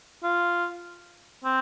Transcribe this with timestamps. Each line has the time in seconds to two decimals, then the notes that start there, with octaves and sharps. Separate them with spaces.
0.24 F4
1.44 C4